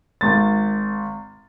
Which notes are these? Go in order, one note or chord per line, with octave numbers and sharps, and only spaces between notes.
G#1 A6